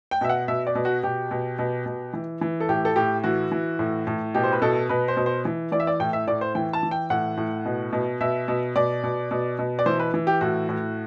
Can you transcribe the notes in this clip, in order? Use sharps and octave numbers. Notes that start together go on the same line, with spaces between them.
G5
B2 E5
F#5
B2 E5
D5
B2
F#4
B2 G4
B2
B2
B2
E3
E3
A4
A2 G4
A4
A2 G4
E3 F#4
E3
A2
A2
B2 G4
C5
B4
B2 A4
B2 B4
C5
B2
C5
E3
E3 D5
E5
D5
A2 G5
E5
A2 D5
C5
E3 G5
A5
E3
G5
A2 F#5
A2
B2
B2
B2 E5
B2
B2 D5
B2
B2
B2
D5
E3 C5
B4
E3
G4
A2 F#4
A2